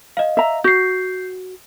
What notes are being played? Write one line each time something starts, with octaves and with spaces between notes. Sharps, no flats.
D#5 F5
E5 A#5
F#4 G6 C7